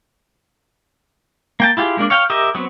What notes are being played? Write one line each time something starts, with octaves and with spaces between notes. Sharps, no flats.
A#3 G5 A5
E4 F4 G4 G#4
G#3 A#3 D4
C#5 F5 G5
G4 A#4 D#5 E5
F#3 B3 C4